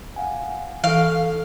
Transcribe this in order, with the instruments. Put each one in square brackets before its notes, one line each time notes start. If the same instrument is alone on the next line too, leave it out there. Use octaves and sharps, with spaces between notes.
[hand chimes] F5 F#5 G#5
[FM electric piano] E3 [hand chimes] A4 C#6 D7 [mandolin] F5